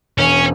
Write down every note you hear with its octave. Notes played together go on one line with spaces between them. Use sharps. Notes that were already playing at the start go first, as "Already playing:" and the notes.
E1 C#4